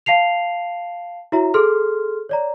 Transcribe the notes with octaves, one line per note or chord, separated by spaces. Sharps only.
F5 A5 C7 F7
E4 F#4 C#5 E5 A#5
G#4 A4 C6 F6
C#5 D5 A#5